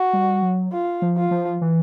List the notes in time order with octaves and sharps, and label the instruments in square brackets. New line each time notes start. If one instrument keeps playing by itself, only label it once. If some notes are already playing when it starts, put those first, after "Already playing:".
Already playing: [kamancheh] F#4
[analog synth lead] G3
F#3
[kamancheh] F4
[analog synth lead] F3
[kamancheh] F4
[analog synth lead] F3
E3